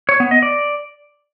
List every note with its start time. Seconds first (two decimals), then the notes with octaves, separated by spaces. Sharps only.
0.09 C#5
0.20 B3
0.31 D#5
0.42 D5